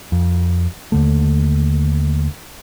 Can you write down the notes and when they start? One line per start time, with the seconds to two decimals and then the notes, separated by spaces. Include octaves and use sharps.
0.12 F2
0.92 D#2 D3 A3